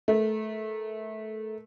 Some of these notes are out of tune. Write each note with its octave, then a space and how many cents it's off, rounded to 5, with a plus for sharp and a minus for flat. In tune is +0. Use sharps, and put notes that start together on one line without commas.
A3 -20 A#4 +0